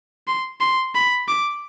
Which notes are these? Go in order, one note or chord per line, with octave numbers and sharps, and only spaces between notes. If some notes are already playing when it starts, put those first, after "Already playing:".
C6
C6
B5
D6